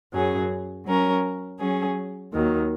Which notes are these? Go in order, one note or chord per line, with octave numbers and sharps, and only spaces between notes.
F#2 F#3 C#4 G#4
F#3 C#4 A#4
F#3 C#4 G#4
D#2 D#3 F#3